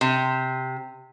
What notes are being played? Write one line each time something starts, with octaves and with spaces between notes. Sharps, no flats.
C3